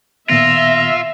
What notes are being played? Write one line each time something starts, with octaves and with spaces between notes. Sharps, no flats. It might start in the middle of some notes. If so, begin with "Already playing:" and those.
A#2 D#3 B3 F4 E5 A#6